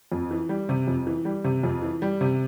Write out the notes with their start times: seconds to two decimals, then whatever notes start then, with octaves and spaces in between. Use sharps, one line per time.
0.12 F2
0.31 E3
0.49 G3
0.69 C3
0.87 F2
1.07 E3
1.25 G3
1.44 C3
1.63 F2
1.82 E3
2.02 G3
2.21 C3